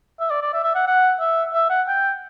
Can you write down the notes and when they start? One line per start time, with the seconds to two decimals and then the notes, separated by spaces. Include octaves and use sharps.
0.20 E5
0.30 D5
0.42 D5
0.53 E5
0.64 E5
0.75 F#5
0.87 F#5
1.20 E5
1.53 E5
1.70 F#5
1.87 G5